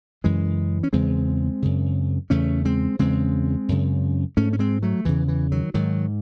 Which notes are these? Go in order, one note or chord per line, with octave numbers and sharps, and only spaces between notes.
F#2 C#3 E3 G#3
C#4
E2 C#3 G#3 C4
F#2 C#3
E2 C#3 A3 C#4
G#3 C4
E2 C#3 G#3 C4
F#2 C#3
G#2 A3 C#4
C#4
G#3 C4
F#3 A3
E2 C#3 E3
E3
D#3 F#3
G#2 D#3 F#3